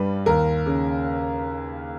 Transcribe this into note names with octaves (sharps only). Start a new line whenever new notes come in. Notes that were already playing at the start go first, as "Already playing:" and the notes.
Already playing: G2 G3 B4
D#2 A#4
C#3